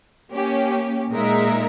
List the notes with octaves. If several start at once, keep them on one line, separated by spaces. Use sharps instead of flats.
A#3 C#4 G4
A#2 G#3 D#4 A#4 E5